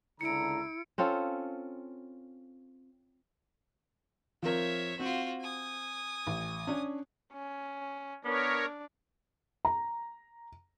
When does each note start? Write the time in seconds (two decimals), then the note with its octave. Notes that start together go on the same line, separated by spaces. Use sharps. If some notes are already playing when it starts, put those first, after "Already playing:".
0.21 C#2 D3 E4 A#5 C#7 D7
0.98 C4 C#4 F4 A4
4.43 F3 C4 A#4 C#5 E5
5.00 C4 F4 F#4
5.40 G#5 D#6
6.27 A1
6.67 C#4 D4
7.33 C#4
8.25 B3 D4 A#4 C#5
9.65 A#5